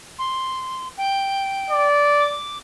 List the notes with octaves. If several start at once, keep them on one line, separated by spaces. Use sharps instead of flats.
C6
G5
D5
D6